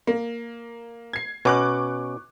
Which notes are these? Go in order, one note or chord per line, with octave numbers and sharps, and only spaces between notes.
A#3
G#6 C7
B2 B3 C#4 C#6 D6 F#6